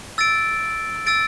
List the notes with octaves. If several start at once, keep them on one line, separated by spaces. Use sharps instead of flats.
E6 A6 D7
E6 A6 D7